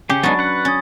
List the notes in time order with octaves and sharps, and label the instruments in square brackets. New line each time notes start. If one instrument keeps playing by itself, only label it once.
[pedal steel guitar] C#3 G4 [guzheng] C#4
[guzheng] F#3 D4 [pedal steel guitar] G#3 B3 D#4 [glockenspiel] B5 C#6 A6
[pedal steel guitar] B4 F#5
[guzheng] C#4 [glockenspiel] D#6 G#6 A6